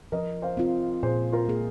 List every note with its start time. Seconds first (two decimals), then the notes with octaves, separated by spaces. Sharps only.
0.12 F3 A#4 D#5
0.42 C5 F5
0.57 C4 F4
1.03 A#2 G#4 C5
1.32 F4 A#4
1.48 A#3 G#4